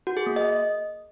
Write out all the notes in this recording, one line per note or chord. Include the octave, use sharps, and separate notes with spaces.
F#4
G#4
A#3
D#5